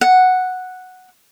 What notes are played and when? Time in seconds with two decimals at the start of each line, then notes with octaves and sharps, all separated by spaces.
0.01 F#5